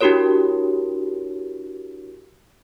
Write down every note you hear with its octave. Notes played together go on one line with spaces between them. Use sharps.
D4 E4 F#4 G4 A#4 C#5